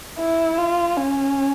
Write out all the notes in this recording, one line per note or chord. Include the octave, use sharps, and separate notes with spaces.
E4
F4
C#4